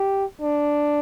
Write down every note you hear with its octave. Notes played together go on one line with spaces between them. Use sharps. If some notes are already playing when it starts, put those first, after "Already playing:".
Already playing: G4
D4